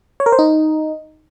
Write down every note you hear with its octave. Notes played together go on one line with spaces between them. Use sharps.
C#5
A#4
C5
D#4